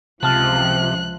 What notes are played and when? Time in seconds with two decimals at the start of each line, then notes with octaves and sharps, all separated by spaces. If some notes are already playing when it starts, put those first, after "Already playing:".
0.23 C#2 C3 F3 A5 F6 F#6 A6